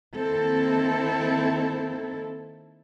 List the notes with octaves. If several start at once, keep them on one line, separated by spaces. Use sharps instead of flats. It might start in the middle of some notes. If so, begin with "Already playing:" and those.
D#3 A#3 C4 E4 A4